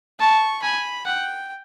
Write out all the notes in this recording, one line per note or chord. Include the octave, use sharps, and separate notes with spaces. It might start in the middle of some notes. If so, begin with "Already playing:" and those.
A5 C#6
G#5 B5
F#5 G5